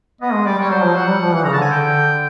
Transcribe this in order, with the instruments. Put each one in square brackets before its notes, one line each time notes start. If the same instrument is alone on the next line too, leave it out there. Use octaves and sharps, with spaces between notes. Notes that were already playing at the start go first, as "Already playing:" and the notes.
[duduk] B3 [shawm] D#5
[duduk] G#3
[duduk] G3 [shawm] D5
[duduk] G3 [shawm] C#5
[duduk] F#3 [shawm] C5
[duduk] F3
[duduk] F#3 [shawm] F#5
[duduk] G3
F3
E3
[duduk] C#3 [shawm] A#5
[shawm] A5
[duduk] D3 [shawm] G#5
[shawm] G5